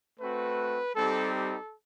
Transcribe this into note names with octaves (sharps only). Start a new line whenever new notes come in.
A3 C4 F#4 B4
G3 C4 D#4 G4 A4
A4